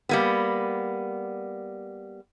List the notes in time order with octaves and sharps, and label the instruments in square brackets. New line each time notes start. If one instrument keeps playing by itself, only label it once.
[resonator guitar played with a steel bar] G3 A#3 B3